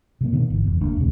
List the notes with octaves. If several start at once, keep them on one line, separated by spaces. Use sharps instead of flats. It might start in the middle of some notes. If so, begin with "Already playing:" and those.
C3 F#3 A#3
B2 D#3 G3 B3
G1 E3
F1 E2
F#1 D#2 A3 D4
E1 C#2 C3